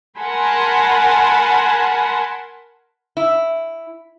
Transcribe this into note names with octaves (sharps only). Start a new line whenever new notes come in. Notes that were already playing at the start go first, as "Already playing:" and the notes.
A#4 F#5 G#5 A5 B5 C6
E4